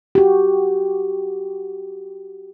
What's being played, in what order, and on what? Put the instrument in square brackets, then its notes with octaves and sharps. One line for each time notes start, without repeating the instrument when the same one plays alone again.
[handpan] F#4 G4